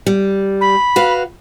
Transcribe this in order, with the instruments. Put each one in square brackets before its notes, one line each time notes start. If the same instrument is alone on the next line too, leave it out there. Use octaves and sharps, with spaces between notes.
[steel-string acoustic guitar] G3
[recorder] B5
[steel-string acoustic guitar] F#4 B4 F5